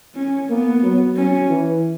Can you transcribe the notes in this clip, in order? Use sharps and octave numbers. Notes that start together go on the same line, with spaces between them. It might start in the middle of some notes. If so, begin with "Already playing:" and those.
C#4
A#3 B3
F#3
F#3 C#4
E3